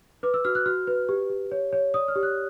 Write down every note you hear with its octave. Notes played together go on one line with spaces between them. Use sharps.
B4 D6
E6
F#4 F6
F#6
F#4 F6
B4
G4
G4
C#5
C#5
D5 D#6
F6
G4
F#6